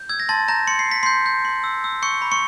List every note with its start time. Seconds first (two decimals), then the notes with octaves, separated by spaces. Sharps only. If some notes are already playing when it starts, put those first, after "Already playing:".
Already playing: G6
0.09 E6 G#6
0.20 A#6
0.29 A5 C6 A6
0.48 A#5 G6 A#6
0.67 C6 C#7
0.79 C7
0.87 C6 B6
1.03 C6 G6 C7
1.26 G6
1.45 C6
1.64 E6
1.84 E6
2.02 C#6 G6 C#7
2.22 B5
2.32 C#6 C#7